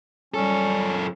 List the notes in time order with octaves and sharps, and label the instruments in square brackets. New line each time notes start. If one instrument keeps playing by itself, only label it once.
[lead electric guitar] F#2 A4 [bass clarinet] G3 [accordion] C#4